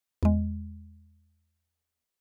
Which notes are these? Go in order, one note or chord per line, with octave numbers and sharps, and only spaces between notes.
E2 G#3